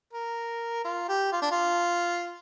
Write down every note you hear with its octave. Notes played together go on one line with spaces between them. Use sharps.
A#4
F4
G4
F4
D4
F4